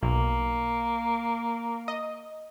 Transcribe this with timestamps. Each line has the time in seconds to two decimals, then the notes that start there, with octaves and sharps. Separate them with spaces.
0.03 B1 A#3
1.88 D#5